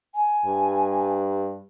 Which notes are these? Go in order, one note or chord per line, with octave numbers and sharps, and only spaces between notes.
G#5
G2